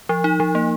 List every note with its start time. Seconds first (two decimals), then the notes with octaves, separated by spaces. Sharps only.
0.09 F3
0.24 D#4
0.40 F3
0.55 A#3